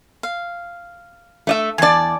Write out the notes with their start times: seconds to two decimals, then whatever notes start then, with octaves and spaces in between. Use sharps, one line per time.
0.23 F5
1.47 A3 D#5 E5
1.78 E2 D5 G#5 A5